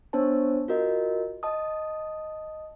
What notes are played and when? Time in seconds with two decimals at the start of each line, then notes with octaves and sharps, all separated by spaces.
0.13 B3 D4 C5 C#5 A5
0.68 F4 F#4 A#4 D#5
1.43 D#5 A5 D#6